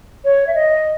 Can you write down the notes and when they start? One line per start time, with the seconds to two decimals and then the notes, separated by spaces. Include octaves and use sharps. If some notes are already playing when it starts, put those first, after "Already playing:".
0.24 C#5
0.47 E5
0.55 D#5